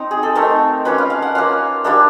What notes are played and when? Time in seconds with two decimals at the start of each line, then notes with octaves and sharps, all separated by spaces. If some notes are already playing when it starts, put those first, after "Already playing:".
Already playing: C4 D#4
0.11 G#4
0.23 A4
0.35 A3 C4 D#4 A#4
0.85 A#3 C#4 F4 B4
0.98 F5
1.10 F5
1.22 F#5
1.35 A#3 C#4 F4 F5
1.84 G3 A#3 D4 E5